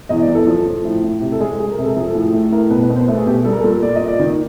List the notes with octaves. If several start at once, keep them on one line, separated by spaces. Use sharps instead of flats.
E2 D#5
D5
E2
A4
F3
F3
A2
A2
C3 G4
A4
G#3 G#4
G#3 G#4
A#4
C3
A4
F3 G#4
A4
A2
G#4
A3
A2 A#4
B2 B4
B4
B2
C5
A3 B4
G#4
B2 G4
G3 A4
A#4
A4
A#2
A#2 D5
D#5
A#2
D5
D#3